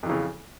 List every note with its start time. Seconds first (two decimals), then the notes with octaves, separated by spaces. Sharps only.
0.03 F2
0.06 E3
0.09 C#3